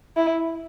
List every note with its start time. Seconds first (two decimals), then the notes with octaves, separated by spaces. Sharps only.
0.17 E4